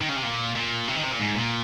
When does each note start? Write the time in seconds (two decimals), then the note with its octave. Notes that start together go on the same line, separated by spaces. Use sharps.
0.01 D#3
0.09 C#3
0.16 C3
0.23 A#2
0.55 A#2
0.88 C3
0.95 D#3
1.03 C3
1.11 A#2
1.20 G#2
1.35 A#2